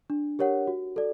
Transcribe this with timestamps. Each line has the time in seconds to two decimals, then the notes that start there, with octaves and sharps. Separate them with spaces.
0.10 D4
0.39 G4 A#4 C#5 F#5
0.67 F#4
0.96 A4 D5